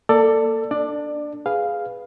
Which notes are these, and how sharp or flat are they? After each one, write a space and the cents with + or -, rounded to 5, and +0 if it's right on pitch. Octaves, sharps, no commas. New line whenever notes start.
A#3 +0 A4 +20 D5 +0
D4 +0 D5 +20
G#4 +0 B4 +0 F5 +0